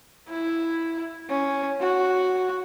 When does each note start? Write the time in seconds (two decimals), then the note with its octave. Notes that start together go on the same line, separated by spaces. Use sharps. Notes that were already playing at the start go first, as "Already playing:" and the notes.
0.29 E4
1.29 C#4
1.80 F#4